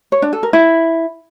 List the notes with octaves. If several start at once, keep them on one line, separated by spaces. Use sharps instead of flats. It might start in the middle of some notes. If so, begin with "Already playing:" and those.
C#5
D4
A4
A#4
E4